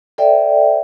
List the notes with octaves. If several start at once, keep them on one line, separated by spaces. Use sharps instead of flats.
A4 C5 D5 E5 G5